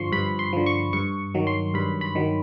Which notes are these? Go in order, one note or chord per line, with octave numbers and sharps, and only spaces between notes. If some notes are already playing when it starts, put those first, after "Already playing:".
Already playing: G2 D3 F3 C6 C#6
G2 B5
C6
D3 F3
C#6
G2 C#6
D#3 F#3
C6
G2 B5
B5
D#3 F#3